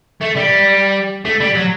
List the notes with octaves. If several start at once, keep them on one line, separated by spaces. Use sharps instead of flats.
A3
G3
A3
G3
F#3